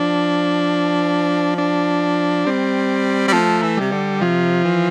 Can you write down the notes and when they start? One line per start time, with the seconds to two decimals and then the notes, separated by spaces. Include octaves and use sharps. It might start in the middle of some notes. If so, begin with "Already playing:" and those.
Already playing: F3 D4
1.58 D4
2.46 G3 C4
3.28 G3
3.33 F3 A3
3.62 E3
3.77 C3 G3
3.92 D3
4.21 C3 F3
4.64 E3